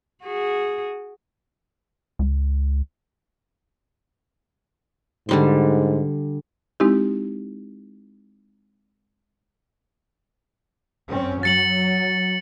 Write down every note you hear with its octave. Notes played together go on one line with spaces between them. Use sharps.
F#4 G#4
C#2
G#2 D3 G3 C6
G#3 C4 D#4 E4 G4
F#2 C4 C#4
F#3 A6 C#7 F#7